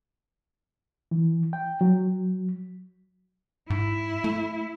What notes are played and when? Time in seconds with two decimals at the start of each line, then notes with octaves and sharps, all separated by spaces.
1.11 E3
1.53 G5
1.81 F#3
3.70 G#2 E4
4.24 A3